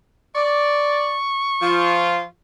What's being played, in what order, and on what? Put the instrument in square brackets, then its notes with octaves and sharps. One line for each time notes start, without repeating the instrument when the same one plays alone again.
[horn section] D5 [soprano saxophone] C#6
[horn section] F3 F4